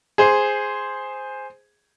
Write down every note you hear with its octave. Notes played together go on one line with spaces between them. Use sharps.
G#4 C5